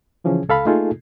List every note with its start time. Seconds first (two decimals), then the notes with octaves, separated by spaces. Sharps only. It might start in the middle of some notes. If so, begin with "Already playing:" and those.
0.24 C#3 E3 F3 C#4 G#4
0.49 C#2 A4 F5 B5
0.65 A3 A#3 D#4 F4 G#4 A4